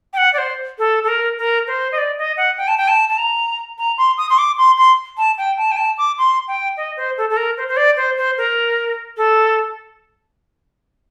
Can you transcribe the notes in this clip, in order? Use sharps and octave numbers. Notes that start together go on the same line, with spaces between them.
G5
F#5
D5
C5
A4
A4
A#4
A#4
C5
D#5
D5
D#5
F#5
G5
A5
G5
A5
A5
A#5
A#5
C6
D#6
C6
D6
C6
C6
A5
G5
A5
G5
A5
D6
C6
G5
D#5
C5
A4
A4
A#4
C5
C5
D5
C5
C5
A#4
A4